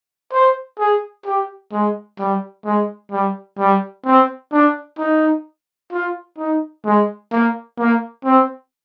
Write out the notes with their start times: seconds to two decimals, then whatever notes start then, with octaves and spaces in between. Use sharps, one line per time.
0.32 C5
0.79 G#4
1.26 G4
1.72 G#3
2.19 G3
2.66 G#3
3.12 G3
3.59 G3
4.06 C4
4.52 D4
4.98 D#4
5.92 F4
6.38 D#4
6.85 G#3
7.32 A#3
7.79 A#3
8.25 C4